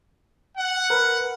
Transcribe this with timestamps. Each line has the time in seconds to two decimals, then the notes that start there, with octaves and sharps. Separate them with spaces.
0.58 F#5
0.90 A#4 B4